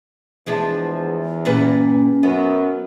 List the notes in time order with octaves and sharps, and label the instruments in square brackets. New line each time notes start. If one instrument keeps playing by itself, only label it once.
[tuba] E2 [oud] F3 G#3 D4
[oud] G2 A#2 B4 [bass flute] C#4
[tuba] F#2 [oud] B3